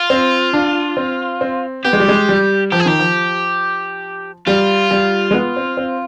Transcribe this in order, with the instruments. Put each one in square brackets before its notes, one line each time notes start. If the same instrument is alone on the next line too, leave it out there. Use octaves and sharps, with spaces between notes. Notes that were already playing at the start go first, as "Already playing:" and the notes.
Already playing: [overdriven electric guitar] F4
[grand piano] C4
D4
C4
C4
[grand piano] B3 [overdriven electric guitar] G4
[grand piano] G#3
G3
G#3
G3
[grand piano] F3 [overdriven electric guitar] G4
[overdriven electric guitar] G#4
[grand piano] D#3 [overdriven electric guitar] G4
[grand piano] F3
[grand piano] G3 [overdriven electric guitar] F4
[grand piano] G3
G#3
B3
C4
C4